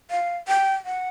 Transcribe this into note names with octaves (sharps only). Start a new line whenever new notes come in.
F5
G5
F#5